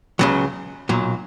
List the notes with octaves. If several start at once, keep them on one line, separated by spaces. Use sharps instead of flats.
C#2 C#3 F#3
B1 A#2 F#3